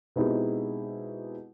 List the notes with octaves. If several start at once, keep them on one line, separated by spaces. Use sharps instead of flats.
B2 G#3 C4 D#4 E4 G4